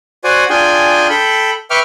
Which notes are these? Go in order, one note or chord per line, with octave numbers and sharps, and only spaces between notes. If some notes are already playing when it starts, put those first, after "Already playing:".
F#4 C5 D5 F#5 G#5
D4 F4 G#4 G5 G#5
A4 G5 B5
B4 E5 G5 C#6 D6 F6